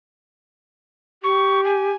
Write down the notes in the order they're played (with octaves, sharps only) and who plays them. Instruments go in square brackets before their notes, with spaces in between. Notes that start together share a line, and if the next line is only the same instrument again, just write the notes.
[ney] G4 [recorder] C#6
[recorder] G#5